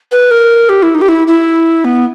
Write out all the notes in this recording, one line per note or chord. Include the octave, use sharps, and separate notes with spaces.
B4
A#4
G4
E4
D#4
G4
E4
E4
B3